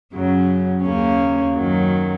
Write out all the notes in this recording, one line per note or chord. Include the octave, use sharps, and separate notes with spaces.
F#2 C#3 F#3
D#2 C#3 A#3 C#4
F#2 D#3 F#3